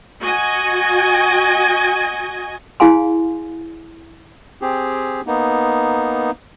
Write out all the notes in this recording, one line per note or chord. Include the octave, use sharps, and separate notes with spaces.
F#4 D#5 G#5
E4 G#4 F5 G#5 C6
C4 G4 G#4
A#3 B3 D#4